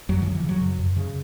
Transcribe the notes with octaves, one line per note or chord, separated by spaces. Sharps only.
F#2 F#3
E3
C#3
E3
C#3
F#3
F#2
F#2
C#3